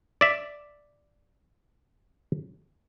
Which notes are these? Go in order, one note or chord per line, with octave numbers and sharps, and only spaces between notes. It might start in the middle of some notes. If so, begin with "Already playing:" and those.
D5 E5